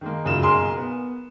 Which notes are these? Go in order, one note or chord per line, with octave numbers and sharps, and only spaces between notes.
D#3 G#3 A#3
F1 F#2 C#3 F#3 F4 E7
B1 A#3 G#4 A#4 C6
B3